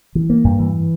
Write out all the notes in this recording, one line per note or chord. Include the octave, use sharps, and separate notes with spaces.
E3
A#3
G2
E3